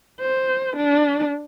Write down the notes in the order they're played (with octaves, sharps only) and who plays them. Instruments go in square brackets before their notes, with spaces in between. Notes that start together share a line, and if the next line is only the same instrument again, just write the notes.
[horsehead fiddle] C5
D4